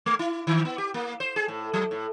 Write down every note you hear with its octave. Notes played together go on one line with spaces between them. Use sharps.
A3
E4
D#3
B3
G4
A#3
C5
G#4
A2
F#3
A2